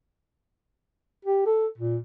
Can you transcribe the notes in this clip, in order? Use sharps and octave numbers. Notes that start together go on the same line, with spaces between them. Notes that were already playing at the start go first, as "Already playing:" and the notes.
G4
A4
A#2